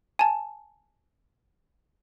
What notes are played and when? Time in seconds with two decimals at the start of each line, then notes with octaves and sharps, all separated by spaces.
0.19 G#5 A5